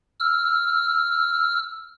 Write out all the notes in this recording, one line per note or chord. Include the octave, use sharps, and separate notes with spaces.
E6 F6